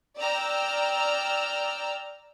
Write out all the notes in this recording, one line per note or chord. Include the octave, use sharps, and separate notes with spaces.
D5 G5 A#5 E6 F6